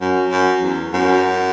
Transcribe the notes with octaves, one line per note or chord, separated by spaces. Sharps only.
F#2
F#2
E2
F#2